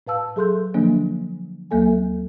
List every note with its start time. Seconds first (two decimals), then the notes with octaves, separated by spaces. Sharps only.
0.07 A2 B4 F5 A5 E6
0.36 F#3 G#4 A4 C6 F#6 G6
0.74 D3 F3 F#3 A#3 D4
1.71 D2 F#3 A#3 A4 G#5